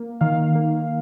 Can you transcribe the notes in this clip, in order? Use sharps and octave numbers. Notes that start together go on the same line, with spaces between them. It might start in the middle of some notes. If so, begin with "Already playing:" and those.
Already playing: A#3
D#3 F5
A#3